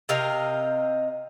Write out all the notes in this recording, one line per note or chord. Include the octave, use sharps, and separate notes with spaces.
C3 A#4 D#5 F5